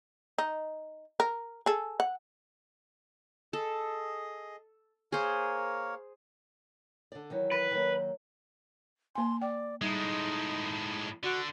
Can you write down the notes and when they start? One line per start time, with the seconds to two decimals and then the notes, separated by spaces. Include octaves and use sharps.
0.38 D#4
1.20 A#4
1.66 G#4 A4
2.00 F#5
3.53 G#4 A4 D#5
5.12 A#3 G#4 A#4 C5 C#5
7.12 D3 D5
7.30 D#3 E3 F#3
7.52 B4
7.71 D#3 F#3 A#3
9.15 A#3 G#5 C6
9.42 D5 G5
9.81 A2 G3 G#3 D#4
11.23 D3 F#4